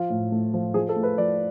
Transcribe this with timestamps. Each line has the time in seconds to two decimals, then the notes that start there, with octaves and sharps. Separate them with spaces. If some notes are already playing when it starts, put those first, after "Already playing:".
Already playing: F3 F4
0.10 A2
0.32 A3
0.54 F3
0.74 F3 G#4
0.89 A4
0.96 A3
1.03 B4
1.18 F3 D5